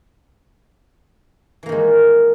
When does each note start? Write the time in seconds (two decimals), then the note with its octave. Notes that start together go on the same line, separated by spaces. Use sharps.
1.63 E3
1.66 A#3
1.69 D#3
1.72 G#3